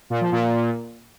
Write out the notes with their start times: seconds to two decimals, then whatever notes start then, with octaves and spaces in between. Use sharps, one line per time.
0.10 A#2
0.21 F3
0.32 A#2